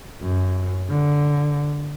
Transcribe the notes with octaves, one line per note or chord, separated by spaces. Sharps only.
F#2
D3